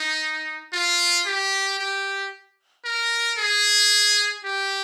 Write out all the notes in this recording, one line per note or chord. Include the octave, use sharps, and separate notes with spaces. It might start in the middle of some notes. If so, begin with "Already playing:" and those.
Already playing: D#4
F4
G4
G4
A#4
G#4
G4